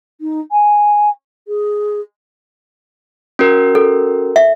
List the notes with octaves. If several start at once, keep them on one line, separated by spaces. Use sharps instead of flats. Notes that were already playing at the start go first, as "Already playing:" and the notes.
D#4
G#5
G#4
C#4 F#4 A#4
A4
E5